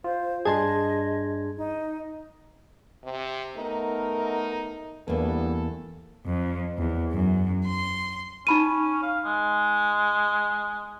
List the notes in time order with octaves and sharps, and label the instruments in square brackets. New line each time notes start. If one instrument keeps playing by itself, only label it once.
[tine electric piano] F4 [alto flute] C5
[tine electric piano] G2 D4 G#6 [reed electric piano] G#4 A5 C6 [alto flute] D#5
[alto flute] D#4
[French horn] C3
[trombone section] A3 B3 A#4 [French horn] D#4
[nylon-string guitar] E2 A#3 [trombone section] G2 E3 B3 [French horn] A4
[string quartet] F2
E2
F#2
C6
[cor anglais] C#4 [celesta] D#4 B5 D#7
[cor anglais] F5
G#3